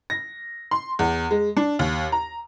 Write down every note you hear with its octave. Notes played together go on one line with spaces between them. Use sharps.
A#6
C6
E2
G#3
D4
D#2
A#5